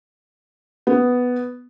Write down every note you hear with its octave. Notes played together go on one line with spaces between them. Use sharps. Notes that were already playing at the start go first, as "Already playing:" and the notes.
B3